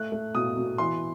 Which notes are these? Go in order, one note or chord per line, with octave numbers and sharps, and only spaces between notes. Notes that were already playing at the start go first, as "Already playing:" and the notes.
Already playing: A3 F#6
A3
B2 D#6
B2
E3 C6